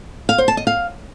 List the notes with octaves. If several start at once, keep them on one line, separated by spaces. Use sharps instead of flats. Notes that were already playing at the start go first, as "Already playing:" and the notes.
F5
C5
A5
D#5
F5